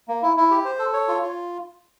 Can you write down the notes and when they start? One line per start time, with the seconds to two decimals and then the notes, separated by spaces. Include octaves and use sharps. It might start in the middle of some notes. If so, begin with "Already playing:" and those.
0.08 A#3
0.22 E4
0.37 E4
0.51 G4
0.65 C5
0.79 A4
0.93 C#5
1.08 F4
1.22 F4